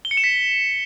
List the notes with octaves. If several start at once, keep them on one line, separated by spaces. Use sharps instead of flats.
G7
C#7
E7
B6